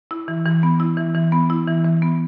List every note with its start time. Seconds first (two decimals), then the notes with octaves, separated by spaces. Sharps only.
0.11 E4
0.28 E3
0.46 E3
0.63 B3
0.80 E4
0.97 E3
1.15 E3
1.32 B3
1.50 E4
1.68 E3
1.85 E3
2.02 B3